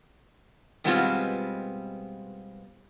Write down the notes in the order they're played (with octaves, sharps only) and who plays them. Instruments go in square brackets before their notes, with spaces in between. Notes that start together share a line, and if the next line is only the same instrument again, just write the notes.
[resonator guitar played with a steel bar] B2 G3 G#3 B3 C4 F4